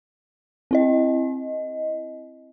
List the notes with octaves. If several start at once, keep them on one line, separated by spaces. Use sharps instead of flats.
C4 E4 D#5